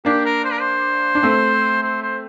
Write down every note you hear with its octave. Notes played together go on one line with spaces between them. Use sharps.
A#3 D4 G4
A#4
C5
A#4
C5
D4
A3 C4
C5
C5